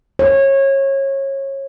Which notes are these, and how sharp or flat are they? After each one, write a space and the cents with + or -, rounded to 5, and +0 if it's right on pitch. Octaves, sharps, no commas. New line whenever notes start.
C#5 -25